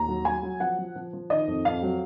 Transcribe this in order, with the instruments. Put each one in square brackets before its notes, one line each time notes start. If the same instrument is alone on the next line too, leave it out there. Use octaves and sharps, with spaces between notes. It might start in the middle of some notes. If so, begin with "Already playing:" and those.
Already playing: [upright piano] D#2 A#5
F#3
F#3 G#5
F#3
F3 F#5
F3
F3
F3
D#3 D#5
F2
F2 F5
F#3